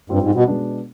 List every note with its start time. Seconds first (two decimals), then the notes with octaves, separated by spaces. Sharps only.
0.10 G2 G3 C4 F4
0.22 G#2
0.35 B2
0.47 B2 G#3 B3 D4